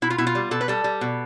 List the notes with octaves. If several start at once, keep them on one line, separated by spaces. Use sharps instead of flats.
B2 E4
F4
B2 E4
F4
G3
B2 A4
B4
G3 A4
G3
B2